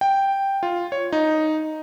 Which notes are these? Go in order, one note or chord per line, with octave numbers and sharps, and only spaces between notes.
G5
F4
C#5
D#4